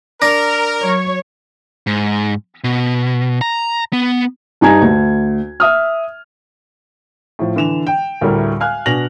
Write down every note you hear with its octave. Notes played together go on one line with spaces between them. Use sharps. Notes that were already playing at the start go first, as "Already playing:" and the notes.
D4 A#4 A#6
F#3 C#5
G#2
B2
A#5
B3
G2 D#4 G#5 A#5 G#6
D2
E5 D#6 F6
A2 F3
D3 E3 E7 F7
G5
D2 A2 G3 A3 A#4
F5 G#5 F6 F#6
B2 D4 G#5 A#6 F7 F#7